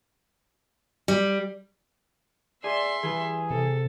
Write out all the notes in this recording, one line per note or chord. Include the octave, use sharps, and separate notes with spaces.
G3
G#4 D5 E5 C6
E3 G3 G#4 B4
C3 A4